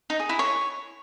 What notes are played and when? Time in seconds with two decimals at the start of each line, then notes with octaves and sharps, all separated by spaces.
0.10 D#4
0.20 G#4
0.29 E4
0.39 C#5